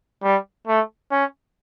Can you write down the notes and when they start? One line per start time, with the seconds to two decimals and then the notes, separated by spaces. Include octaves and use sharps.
0.23 G3
0.67 A3
1.11 C#4